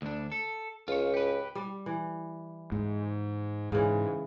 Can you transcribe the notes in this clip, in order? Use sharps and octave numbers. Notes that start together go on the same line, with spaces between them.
D2 D4
A4
C#2 F4 C#5
G4 B4
G3
E3
G#2
G#2 C#3 E3